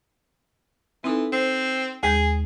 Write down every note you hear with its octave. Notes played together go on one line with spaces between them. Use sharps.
E3 C4 D#4 A4
C4 C5
D#2 G#3 G#4 G6